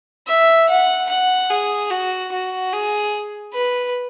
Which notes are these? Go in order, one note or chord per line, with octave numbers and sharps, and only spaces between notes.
E5
F#5
F#5
G#4
F#4
F#4
G#4
B4